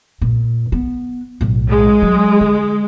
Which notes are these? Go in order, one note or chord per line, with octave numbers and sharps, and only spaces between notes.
A#2
B3
B1 A2
G#3
F#3
D3